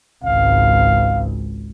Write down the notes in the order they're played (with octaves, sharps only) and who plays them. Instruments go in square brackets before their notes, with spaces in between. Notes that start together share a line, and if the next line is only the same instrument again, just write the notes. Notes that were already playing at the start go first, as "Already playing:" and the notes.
[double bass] G#1 C#2 [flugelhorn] F5